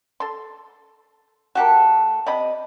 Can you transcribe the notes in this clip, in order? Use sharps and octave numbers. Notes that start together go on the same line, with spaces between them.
A4 C6
A3 F#4 G4 A4 A#4 F#6
C3 D5 D#5 B5